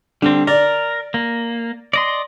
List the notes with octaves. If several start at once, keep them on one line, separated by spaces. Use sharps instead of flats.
D3 G3 C4
A#4 D5
A#3
D5 D#5 C6